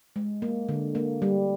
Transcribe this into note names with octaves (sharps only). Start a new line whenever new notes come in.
G#3
A#3
D3
A#3
G3